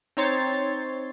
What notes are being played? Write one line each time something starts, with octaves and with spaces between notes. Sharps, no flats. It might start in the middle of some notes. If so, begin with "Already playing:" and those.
C4 D#4 C#5 C6 A6